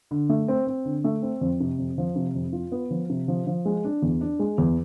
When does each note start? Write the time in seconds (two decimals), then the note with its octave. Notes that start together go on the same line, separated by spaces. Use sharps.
0.11 D3
0.29 A3
0.48 C4
0.67 C4
0.85 D3
1.04 A3
1.22 C4
1.41 F2
1.60 C3
1.78 F2
1.98 F3
2.16 C3
2.35 F2
2.53 F4
2.72 B3
2.91 F3
3.10 C3
3.28 F3
3.47 F3
3.65 G#3
3.84 D4
4.02 E2
4.21 D4
4.39 G#3
4.58 E2